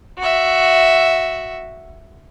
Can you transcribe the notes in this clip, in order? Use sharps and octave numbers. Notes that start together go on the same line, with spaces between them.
F#4 E5